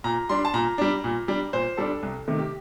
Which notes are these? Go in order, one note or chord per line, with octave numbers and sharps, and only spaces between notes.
A#2 A#5
G3 D4 C6
A5
A#2 A#5
G3 D4
A#2
G3 D4
A#2 C5
G3 D4 A4
C2
C3 D#3 A3
G4